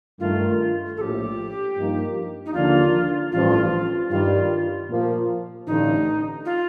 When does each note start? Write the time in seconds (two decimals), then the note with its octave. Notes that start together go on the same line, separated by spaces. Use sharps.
0.20 G2 D#3 A3 F4
0.97 A#1 A2 F3 G4 A4
1.75 G2 F3 A#3 D#4
2.46 D#4
2.53 D#2 D3 F3 A#3 D4 F4
3.32 A1 G2 F3 F4
4.10 G2 D#3 G3 F4
4.89 A#2 F3 A#3
5.67 A1 G2 D3 D#4
6.45 F4